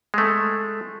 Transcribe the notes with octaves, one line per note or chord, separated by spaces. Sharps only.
G#3 A3